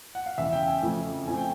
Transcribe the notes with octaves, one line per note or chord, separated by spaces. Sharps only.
F#5
F5
E2 C#3 E3 E5
G5
G#5
F2 C#3 F3 A3
A#2 F3 A3 C4 G#5
G5